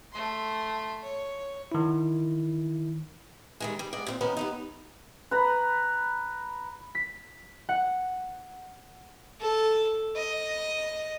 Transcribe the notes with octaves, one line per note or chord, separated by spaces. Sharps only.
A3 C6
C#5
D#3 E4
D#3 G3 G#3
G3
G#2 D5 D#5
A#2 G3 C4
D#3 B3 C#4 D#4
G2 B3 D#4
B4 A#5 B5
B6
F#5
A4
D#5